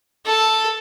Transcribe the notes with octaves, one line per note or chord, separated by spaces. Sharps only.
A4